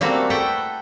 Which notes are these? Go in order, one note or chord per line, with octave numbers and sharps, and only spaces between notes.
G3 A3 A#3 C4 E4 F#4
A4 B4 E5 F#5 G5 A5